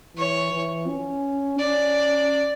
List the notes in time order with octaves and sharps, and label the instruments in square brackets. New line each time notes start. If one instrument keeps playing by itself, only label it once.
[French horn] E3 [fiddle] C#5
[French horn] E3
C#4
[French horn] C#4 [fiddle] D5